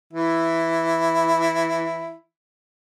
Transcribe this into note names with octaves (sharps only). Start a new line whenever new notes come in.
E3 E4